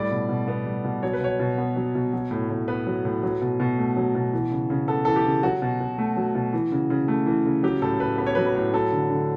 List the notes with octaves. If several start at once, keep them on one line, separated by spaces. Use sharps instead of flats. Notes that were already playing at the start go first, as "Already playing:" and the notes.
Already playing: A2 G3 D5
B2
B2
B3
G3
B2
F#3 C#5
B4
B2 C#5
B2
B3
F#3
B2
F#3
A2
A2
B3 B4
F#3
A2
F#3
B2
B2
A3
F#3
B2
E3
C#3
C#3
B3 A4
E3 A4
G4
C#3
F#3 F#4
B2
B2
A3
F#3
B2
E3
C#3
C#3
A3
E3
C#3
F#3 G4
A2 A4
A2 B4
B3 B4
C#5
F#3 B4
B4
A2
F#3 A4
D3
D3